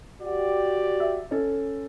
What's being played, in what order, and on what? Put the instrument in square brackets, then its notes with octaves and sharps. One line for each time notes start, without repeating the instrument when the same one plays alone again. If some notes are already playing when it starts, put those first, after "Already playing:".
[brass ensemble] F#4 G4 D5
[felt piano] E5
C#4 A4